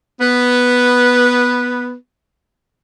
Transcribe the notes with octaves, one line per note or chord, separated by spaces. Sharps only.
B3 B4